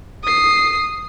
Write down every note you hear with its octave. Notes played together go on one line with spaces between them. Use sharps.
D#6 C7